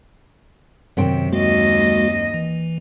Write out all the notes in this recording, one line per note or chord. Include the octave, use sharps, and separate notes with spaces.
F#2 C3 D#3 C4 G5
D#2 G#3 A#3 F#4 D#5
E3